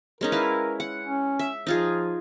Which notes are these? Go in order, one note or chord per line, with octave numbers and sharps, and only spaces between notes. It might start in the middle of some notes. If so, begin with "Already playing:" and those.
G#3 C#4 D#4 A#4
E4 B4 F5
F#5
C#4
E5
F3 D#4 F4 G#4